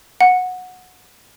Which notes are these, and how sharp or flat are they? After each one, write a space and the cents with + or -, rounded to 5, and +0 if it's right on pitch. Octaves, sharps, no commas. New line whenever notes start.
F#5 -15